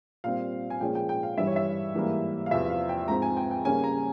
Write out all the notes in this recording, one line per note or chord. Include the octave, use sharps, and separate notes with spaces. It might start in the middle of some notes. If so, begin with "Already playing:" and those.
A#2 G3 C4 F5
G#5
A#2 F3 G#3 C#4 G5
G5
G5
F5
G2 E3 G3 E5
C#5
E5
G#2 E3 G3 A#3
F5
E2 C3 F3 E5
F5
G5
G#2 F3 C4 A#5
G#5
G5
G5
C#3 G3 A#3 C#4 G#5
A#5